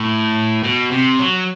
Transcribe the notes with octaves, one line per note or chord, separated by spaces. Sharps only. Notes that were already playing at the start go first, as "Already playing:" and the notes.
Already playing: A2
B2
C3
F#3